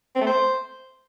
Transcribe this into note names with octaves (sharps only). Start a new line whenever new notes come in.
C4
A3
C5